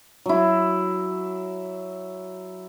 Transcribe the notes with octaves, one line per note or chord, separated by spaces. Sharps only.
F#3 E4